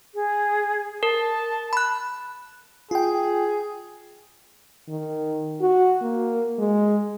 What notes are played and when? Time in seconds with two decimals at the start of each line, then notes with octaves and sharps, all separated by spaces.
0.14 G#4
1.03 A#4 A5
1.73 B5 F#6
2.91 F4 G#4 G5
4.89 D#3
5.61 F#4
6.02 A#3
6.59 G#3